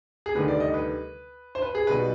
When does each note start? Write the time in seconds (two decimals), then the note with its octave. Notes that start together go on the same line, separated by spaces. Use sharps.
0.26 G#4
0.35 D2 C3 D#3 G3 B4
0.48 D5
0.60 D#5
0.74 B4
1.55 C5
1.62 B4
1.75 G#4
1.87 B1 B2 G3 B4